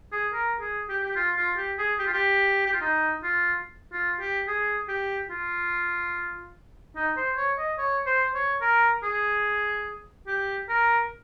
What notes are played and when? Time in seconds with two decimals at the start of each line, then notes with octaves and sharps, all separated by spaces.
0.13 G#4
0.33 A#4
0.61 G#4
0.89 G4
1.04 G4
1.16 F4
1.37 F4
1.57 G4
1.79 G#4
1.99 G4
2.06 F4
2.13 G4
2.66 G4
2.74 F4
2.81 D#4
3.24 F4
3.93 F4
4.20 G4
4.47 G#4
4.89 G4
5.30 F4
6.96 D#4
7.17 C5
7.37 C#5
7.58 D#5
7.78 C#5
8.06 C5
8.35 C#5
8.62 A#4
9.03 G#4
10.27 G4
10.69 A#4